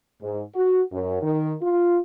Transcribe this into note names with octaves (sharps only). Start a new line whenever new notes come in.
G#2
F#4
F#2
D#3
F4